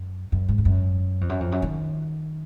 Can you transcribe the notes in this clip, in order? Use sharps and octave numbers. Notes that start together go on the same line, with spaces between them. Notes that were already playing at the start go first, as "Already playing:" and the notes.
Already playing: F#2
F#2
G#2
F2
F#2
F2
F#2
F2
F#2
D#3